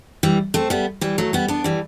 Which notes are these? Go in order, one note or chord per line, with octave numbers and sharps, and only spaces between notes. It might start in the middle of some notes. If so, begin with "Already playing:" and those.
E3 G3
A3 C4
G3 B3
E3 G3
F#3 A3
G3 B3
B3 D4
E3 G3